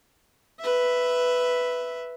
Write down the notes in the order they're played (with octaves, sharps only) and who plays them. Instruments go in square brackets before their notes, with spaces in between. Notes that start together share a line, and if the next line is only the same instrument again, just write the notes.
[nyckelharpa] B4 E5